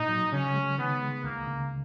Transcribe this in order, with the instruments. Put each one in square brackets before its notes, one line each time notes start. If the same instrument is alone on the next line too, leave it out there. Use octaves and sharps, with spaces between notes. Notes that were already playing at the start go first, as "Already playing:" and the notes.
Already playing: [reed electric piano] A#2 [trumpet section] D#4
[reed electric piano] F#3
[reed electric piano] C#3 [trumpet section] C#4
[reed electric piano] G#3
[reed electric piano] D#3 [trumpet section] B3
[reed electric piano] G#3
[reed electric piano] C#2 [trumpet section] A#3
[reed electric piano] C#3